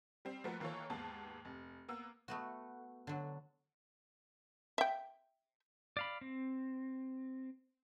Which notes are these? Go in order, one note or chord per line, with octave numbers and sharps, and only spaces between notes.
G3 C4
F3 A3 A#3 F#4 A#4 B4
D#3 E3 A#3 F4 A4 C#5
D#2 G#2 B3 A5
F1
A#3 B3 E6
A3 B3 F#4
D3 F#3
E5 G5
D5 F5 B5
C4